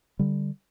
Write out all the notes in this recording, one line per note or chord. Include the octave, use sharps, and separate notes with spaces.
D3 G3